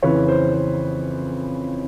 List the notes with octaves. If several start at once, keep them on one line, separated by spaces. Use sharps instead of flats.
F2 C#3 E3 B4 C#5
C5
C5